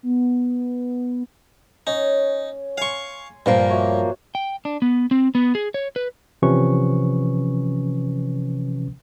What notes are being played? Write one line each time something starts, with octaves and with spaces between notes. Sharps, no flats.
B3
C#4 D#4
F5 G#5 C6 C#6
G2 A#2 F3 A#3 B3
F#4 C#5 E5
G5
D4
B3
C4
B3
G#4
C#5
B4
C3 E3 F3 C#4 B4 C#6